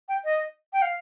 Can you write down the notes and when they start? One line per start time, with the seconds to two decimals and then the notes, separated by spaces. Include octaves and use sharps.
0.09 G5
0.25 D#5
0.73 G5
0.82 F5